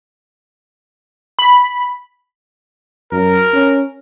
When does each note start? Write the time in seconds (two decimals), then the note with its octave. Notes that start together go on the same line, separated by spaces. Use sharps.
1.39 B5
3.12 F#2 A#4
3.53 C#4